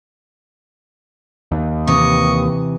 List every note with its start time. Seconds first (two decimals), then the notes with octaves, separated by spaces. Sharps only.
1.52 D#2
1.87 C3 E3 D#5 C#6 D#6